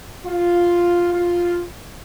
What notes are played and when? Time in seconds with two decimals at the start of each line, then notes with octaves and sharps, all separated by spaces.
0.26 F4
1.13 F4